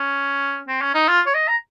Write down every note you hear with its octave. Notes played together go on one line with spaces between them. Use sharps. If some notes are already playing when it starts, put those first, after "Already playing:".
Already playing: C#4
C4
C#4
D#4
F4
C#5
D#5
A#5